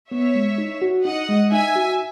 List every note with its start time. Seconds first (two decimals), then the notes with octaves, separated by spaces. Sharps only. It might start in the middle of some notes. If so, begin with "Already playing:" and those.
0.11 B3 C#5 E5
0.35 G#3
0.58 D#4
0.82 F#4
1.05 D#4 D#5 F#5
1.29 G#3
1.52 D#4 E5 G#5
1.75 F#4